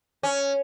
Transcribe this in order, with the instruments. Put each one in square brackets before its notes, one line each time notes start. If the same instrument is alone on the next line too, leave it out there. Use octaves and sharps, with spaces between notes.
[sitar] C#4